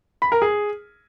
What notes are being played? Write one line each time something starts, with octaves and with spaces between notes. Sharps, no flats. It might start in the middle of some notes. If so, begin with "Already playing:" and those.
B5
A#4
G#4